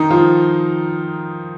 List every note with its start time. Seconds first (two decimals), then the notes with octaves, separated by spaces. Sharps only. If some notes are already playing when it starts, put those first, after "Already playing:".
Already playing: D#3 D#4
0.10 F3 F4